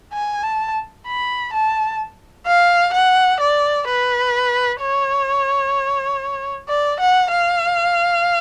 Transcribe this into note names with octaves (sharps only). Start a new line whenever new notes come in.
G#5
A5
B5
A5
F5
F#5
D5
B4
C#5
D5
F#5
F5